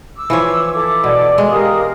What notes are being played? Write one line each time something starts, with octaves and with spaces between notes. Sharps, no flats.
D6 E6
E3 F3 C#5
E4 A4 D6
B2 D5
G#3
G4 A#4 F5 D#6